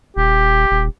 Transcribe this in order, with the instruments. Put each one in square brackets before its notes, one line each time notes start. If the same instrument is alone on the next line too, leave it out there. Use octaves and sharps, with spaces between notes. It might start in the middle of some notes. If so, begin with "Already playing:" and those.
[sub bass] D#1 [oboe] G4
[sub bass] D#1